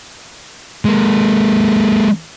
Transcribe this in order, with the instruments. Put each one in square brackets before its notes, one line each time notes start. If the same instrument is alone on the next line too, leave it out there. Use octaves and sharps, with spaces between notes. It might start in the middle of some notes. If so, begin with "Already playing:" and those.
[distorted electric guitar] G#3 A#3